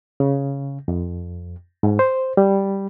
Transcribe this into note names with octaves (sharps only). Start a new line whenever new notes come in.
C#3
F2
G#2
C5
G3